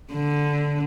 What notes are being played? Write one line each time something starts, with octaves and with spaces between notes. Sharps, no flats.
D3